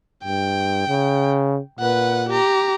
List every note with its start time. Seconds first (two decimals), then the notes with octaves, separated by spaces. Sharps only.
0.24 G2 G5
0.88 C#3
1.79 A#2 B4 F#5
2.29 G4 A#5